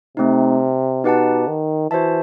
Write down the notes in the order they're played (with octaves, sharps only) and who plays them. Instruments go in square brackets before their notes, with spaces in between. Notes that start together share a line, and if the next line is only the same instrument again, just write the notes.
[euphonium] C3 [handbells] A3 C4 D#4
[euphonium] B2 [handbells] D#4 G4 B4 F#5 A5
[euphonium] D#3
[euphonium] E3 [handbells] F#4 C5 E5 A5